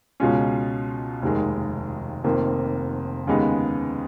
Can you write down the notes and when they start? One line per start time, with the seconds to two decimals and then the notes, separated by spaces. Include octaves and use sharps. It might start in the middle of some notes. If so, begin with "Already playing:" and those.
0.20 C#2 B2 G#3 C#4 F4
1.22 F1 D#2 D#3 G#3
2.24 F1 F2 D#3 A#3
3.27 D#2 C#3 G#3 B3 D#4